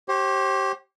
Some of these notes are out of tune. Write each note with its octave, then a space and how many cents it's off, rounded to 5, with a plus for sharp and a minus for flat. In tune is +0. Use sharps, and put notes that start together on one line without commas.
G4 -20 C5 +40